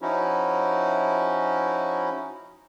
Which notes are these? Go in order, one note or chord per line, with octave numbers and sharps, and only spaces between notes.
F3 C#4 D#4 E4 F#4